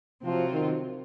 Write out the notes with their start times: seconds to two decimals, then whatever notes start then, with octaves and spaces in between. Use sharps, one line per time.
0.24 C3 F3 F#3 C4 F4
0.53 D#3